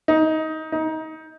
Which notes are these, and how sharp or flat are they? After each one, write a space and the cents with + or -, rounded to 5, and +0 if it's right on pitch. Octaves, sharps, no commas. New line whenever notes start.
D#4 +20
D#4 +25